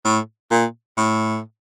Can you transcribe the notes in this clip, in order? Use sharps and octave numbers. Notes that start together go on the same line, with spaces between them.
A2
A#2
A2